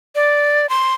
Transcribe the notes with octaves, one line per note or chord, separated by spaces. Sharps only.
D5
C6